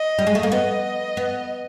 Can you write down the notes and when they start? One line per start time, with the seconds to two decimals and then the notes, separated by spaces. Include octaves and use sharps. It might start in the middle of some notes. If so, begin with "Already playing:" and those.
Already playing: D#5
0.18 G3
0.27 G#3
0.35 A3
0.43 A#3
0.51 B3 D#5
1.17 B3